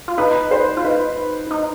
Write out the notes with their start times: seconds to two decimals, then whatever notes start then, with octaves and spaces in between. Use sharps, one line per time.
0.08 F4
0.18 D#4 B4
0.51 C5
0.77 F4
0.84 D#4 B4
1.51 D#4